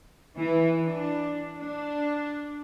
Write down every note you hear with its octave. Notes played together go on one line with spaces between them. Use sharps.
E3
D4
D4